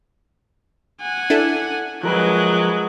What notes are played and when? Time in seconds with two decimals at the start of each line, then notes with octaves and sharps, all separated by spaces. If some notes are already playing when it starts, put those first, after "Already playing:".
1.01 F#5 G#5
1.30 D4 E4 A4
2.03 F3 F#3 G#3 A#4 B4 F#6